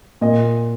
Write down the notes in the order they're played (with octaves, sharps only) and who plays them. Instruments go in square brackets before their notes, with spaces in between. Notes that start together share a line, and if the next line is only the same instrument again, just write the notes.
[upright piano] A#2 D#5